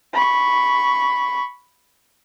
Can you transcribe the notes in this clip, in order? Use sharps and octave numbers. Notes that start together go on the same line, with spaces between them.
B5 C#6